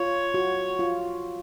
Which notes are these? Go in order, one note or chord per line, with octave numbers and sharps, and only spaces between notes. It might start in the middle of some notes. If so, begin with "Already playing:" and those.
Already playing: F4 C#5
F#4
F4